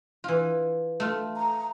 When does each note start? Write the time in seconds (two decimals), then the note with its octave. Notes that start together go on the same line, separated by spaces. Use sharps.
0.24 E3 F4
1.00 A3 F4
1.36 A#5